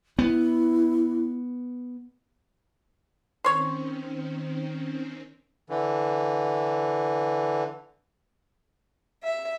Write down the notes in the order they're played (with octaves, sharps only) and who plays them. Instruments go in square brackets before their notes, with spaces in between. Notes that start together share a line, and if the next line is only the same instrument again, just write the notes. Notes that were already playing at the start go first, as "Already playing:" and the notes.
[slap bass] B3 [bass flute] E4
[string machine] D#3 C4 C#4 [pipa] C5 C#5
[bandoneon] D3 E3
[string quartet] E5